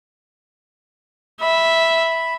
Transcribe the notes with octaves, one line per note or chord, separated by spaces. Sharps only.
E5 B5